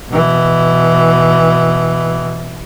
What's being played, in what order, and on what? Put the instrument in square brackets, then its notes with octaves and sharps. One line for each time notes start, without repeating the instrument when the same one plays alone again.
[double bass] B2 E3